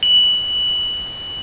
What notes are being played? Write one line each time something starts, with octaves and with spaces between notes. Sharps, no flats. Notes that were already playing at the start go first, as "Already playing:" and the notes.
F#7